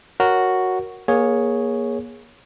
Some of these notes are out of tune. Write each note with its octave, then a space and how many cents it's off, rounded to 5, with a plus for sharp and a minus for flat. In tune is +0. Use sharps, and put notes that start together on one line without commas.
F#4 +0 A#4 +0 C#5 +0
A#3 +25 G#4 +0 C#5 +0